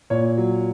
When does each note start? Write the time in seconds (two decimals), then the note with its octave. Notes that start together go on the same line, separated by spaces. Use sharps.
0.10 A#2 C#5
0.38 F#3